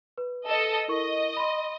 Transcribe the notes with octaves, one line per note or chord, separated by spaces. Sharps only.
B4
A4 D#5
E4 A#4 D#5 C#6
B5 C6